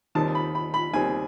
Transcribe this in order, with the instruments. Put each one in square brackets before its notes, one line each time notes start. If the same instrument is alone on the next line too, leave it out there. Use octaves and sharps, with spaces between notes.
[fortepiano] D#2 D#3 G3 C4 A5
B5
B5
B5
D#2 D#3 G3 C4 G#5